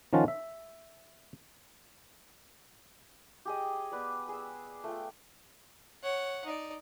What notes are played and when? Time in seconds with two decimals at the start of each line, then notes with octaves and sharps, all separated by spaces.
0.13 D#3 F3 C#4 F4 F#5 A5
0.28 E5
3.45 G4 G#4 D#5
3.92 B3 B4 D5
4.29 G#4 E6
4.84 A3 F4 G5
6.03 C#5 F#5
6.45 D#4 D5